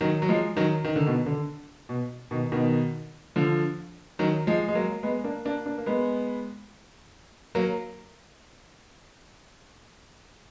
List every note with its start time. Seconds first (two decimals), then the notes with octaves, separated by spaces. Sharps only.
0.01 D#3 F#3
0.22 F#3
0.28 F3 G#3
0.57 D#3 F#3
0.85 D#3
0.96 D3
1.07 B2 D#3
1.26 D3
1.89 B2
2.31 B2 D#3
2.52 B2 D#3
3.36 D3 F3
4.19 D#3 F#3
4.47 F3 G#3
4.68 G#3
4.75 F#3 A#3
5.03 G#3 B3
5.24 A#3 D4
5.45 A#3 D4
5.66 A#3 D4
5.78 A#3
5.86 G#3 B3
7.55 F#3 A#3